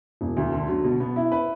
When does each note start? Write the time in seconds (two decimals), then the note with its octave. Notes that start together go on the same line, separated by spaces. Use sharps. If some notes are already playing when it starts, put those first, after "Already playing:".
0.21 E1
0.37 D2
0.52 D3
0.68 F#3
0.84 B2
1.00 B3
1.16 E4
1.32 B4